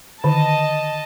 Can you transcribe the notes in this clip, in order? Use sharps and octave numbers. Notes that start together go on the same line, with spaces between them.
D3 D#3 D#5 A5